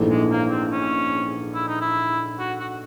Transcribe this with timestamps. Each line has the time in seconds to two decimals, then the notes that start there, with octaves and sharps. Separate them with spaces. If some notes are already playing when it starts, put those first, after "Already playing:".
Already playing: A#1 G#2 E3 A3
0.09 G#3
0.30 A#3
0.50 C4
0.72 C#4
1.55 E4
1.68 D#4
1.81 E4
2.39 F#4
2.60 F#4